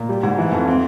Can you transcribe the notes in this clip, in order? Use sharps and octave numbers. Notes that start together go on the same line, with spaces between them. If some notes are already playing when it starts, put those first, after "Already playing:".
Already playing: A#2
G3
G#2
E3
F2
C4